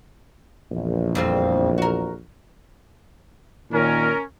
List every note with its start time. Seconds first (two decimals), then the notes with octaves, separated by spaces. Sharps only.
0.71 A#1 E2
1.15 F2 G3 C4
1.78 F#4 A#4
3.72 A#2 D#3 C#4 A#4